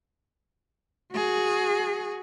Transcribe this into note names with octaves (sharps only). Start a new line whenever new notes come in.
F#4 G#4